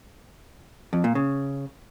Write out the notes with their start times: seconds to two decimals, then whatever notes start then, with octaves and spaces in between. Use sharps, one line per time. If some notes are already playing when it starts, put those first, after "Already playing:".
0.93 F2
1.04 A#2
1.15 C#3